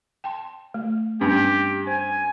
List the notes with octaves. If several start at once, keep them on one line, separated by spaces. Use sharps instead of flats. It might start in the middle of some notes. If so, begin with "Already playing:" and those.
G5 A5 C6
A3
G2 C4 C#4 G4
C5 G#5